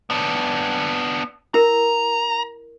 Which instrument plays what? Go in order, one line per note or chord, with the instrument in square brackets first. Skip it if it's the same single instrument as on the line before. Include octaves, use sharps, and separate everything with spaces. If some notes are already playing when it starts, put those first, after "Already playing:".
[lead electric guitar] B3 D4
[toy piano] E4 A#4 [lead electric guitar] A#5